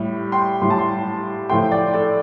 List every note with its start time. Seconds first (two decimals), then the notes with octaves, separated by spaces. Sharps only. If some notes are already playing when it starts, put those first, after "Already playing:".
Already playing: A2 G3
0.32 G5 C6
0.62 A2 G3 C6
0.70 A5
0.79 G5 C6
1.49 A2 F3 A3 G5 C6
1.72 D5 G5
1.94 A4 D5